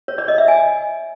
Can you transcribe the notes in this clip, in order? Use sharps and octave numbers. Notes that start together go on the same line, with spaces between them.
C#5
D5
D#5
E5
G#5